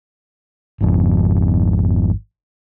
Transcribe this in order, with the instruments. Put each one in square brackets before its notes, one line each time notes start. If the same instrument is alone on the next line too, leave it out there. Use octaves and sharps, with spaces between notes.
[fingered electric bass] G#1 F2